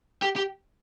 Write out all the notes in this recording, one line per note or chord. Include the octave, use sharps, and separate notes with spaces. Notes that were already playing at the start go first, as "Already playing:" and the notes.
G4
G4